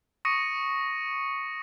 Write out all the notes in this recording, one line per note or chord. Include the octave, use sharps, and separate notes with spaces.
C#6 D#6 A#6 C#7 D#7